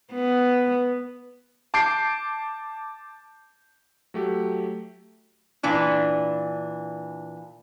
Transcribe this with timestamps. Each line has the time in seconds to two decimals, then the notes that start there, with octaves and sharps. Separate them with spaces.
0.13 B3
1.74 A5 D6 G6 C7 D7
4.14 F#3 A3 G4
5.63 A#2 E3 D4